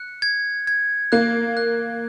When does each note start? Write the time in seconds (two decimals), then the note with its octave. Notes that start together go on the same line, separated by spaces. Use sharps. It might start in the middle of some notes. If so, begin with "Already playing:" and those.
Already playing: F#6 C#7
0.22 G#6
0.67 G#6
1.12 A#3 F#6
1.57 F#6